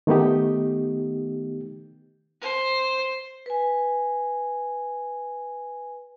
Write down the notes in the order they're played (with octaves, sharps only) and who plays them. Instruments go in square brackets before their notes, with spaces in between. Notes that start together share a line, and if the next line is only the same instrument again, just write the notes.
[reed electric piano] D#3 A3 B3 D#4 G4
[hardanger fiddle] C5
[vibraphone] B4 G#5